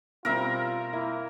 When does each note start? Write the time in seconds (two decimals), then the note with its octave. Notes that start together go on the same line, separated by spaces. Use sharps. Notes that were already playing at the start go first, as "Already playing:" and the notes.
0.25 B2 G3 C4 F4 A#4 E5
0.93 A#3 E4